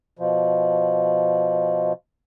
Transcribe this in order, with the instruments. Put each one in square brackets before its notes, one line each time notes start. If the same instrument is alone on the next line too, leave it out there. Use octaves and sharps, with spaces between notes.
[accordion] B2 F3